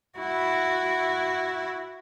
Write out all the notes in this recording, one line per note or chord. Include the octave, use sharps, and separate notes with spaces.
E4 F#4